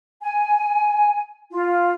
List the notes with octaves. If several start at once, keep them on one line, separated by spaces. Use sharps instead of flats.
G#5
F4